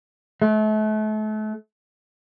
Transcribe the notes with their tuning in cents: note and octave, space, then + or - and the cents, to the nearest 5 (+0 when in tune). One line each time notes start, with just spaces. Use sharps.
A3 -35